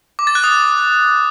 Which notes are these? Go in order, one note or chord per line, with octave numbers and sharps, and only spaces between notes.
D6
A6
F#6
D#6